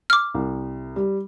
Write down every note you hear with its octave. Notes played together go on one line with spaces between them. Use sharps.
D6 F6
C2
G3